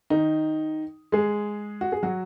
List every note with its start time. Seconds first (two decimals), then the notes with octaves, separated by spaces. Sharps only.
0.10 D#3 D#4
1.12 G#3 G#4
1.81 F#4
1.92 G#4
2.03 F#3 F#4